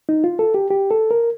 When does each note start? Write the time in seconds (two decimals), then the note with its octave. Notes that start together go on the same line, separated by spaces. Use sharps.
0.09 D#4
0.24 F4
0.39 A4
0.54 G4
0.71 G4
0.91 A4
1.11 A#4